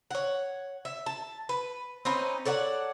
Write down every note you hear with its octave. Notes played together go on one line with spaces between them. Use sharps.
C#5 F#5
E5
A5
B4
C4 C#4 D#4 B4
A4 C#5 D5 F#5